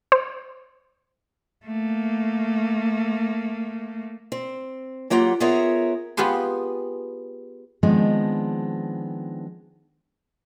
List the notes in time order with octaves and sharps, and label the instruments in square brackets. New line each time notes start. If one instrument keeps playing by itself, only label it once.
[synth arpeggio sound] C5
[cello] A3 A#3
[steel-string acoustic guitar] C4
F#3 A#3 F4 G4 F#5
B3 F4 G#4 A#4 C#5 E5
[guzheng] B3 F4 G4 G#4 C6
[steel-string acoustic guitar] D#3 F3 G#3 B3 C4 D4